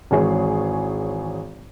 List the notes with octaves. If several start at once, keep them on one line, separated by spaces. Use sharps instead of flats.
G#1 E3 G#4 C#5